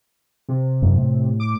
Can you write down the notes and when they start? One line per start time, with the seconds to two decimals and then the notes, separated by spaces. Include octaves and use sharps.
0.49 C3
0.82 F#2
0.94 A2
1.40 D6